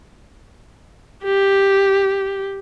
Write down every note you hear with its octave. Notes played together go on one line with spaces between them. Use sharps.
G4